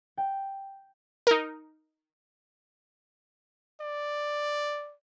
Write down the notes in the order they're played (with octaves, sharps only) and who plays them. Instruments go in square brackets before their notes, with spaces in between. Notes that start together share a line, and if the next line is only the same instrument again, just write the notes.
[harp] G5
[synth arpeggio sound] D#4 A#4
[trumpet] D5